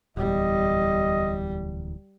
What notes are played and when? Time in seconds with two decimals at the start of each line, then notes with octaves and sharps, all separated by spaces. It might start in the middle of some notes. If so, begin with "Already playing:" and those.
0.17 D1 E2 G3 D#5